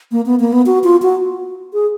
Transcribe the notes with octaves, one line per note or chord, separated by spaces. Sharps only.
A#3
B3
A#3
B3
F#4
F4
F#4
G#4